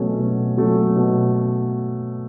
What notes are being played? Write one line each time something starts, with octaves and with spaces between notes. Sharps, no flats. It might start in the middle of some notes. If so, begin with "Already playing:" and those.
Already playing: B2 F#3 A3 C#4
B2
F#3 A3 C#4
B2